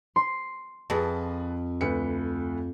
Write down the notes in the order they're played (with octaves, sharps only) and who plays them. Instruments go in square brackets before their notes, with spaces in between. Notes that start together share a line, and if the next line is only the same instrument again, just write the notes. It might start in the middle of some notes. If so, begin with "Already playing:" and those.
[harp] C6
[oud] F2 [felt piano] G#4 B4 A5
[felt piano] D2 B4 C#7